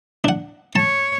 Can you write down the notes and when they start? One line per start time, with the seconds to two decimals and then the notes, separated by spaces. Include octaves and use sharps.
0.24 D4 F#5
0.76 C#5 A5